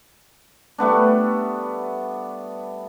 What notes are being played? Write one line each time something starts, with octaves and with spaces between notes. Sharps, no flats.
G3 A3 B3 D4